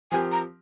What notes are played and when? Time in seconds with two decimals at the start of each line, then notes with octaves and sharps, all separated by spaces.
0.11 F3 C4 G4 A#4 G#5
0.32 A#5